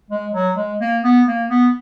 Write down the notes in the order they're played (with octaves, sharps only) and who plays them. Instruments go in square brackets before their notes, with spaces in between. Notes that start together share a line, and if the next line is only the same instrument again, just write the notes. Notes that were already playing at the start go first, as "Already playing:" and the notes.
[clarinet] G#3
F#3
G#3
A#3
B3
A#3
B3